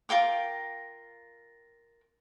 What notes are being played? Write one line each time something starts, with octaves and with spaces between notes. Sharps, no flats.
F4 A#4 G5 D6